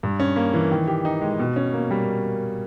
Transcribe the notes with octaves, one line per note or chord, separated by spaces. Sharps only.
G2
C#4
A#3
E3
D#3
G4
D#4
G#3
B2
C#4
A#3
G3